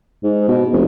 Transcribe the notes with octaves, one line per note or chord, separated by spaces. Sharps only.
G#2
B2
F1